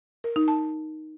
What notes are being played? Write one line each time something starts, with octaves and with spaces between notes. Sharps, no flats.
A#4
D#4
A5